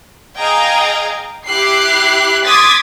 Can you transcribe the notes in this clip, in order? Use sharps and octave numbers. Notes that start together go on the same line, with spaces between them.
G#4 D#5 F5 G5 A#5 G#6
E4 G4 F#6 C7
C6 D6 D#6 G#6 A6 B6